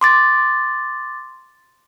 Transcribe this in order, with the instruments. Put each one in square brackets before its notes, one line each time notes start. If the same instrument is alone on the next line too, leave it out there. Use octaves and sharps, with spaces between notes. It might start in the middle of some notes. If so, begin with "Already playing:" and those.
[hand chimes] C6 D6 A6